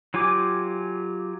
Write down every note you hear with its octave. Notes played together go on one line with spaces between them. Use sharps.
F#3 F4 G4 G#5 D6